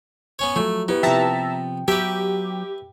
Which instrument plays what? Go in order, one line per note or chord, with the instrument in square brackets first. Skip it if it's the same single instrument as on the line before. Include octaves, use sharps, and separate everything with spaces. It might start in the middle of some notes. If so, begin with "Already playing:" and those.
[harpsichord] B3 C#4 C#5
[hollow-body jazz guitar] F3 F#3 [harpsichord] A3
[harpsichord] B3 [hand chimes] E4 G4 B4
[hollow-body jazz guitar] C3 F3 [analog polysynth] E5 A5 A#5 [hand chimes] G5
[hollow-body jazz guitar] F#3 B3 [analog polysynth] G4 [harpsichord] B4 E5